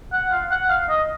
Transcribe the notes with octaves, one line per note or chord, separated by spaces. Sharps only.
F#5
F5
F#5
F5
D#5